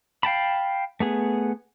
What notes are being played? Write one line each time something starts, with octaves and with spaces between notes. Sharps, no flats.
F5 G5 A5 B5
A3 B3 G#4